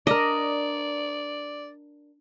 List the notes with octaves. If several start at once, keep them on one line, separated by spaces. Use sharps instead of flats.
D4 A#4 D5 D#5